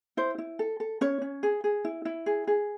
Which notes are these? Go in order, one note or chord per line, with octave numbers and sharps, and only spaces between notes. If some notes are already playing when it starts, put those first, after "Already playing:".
E4 C5
E4
A4
A4
C#4 C#5
C#4
G#4
G#4
E4
E4
G#4
G#4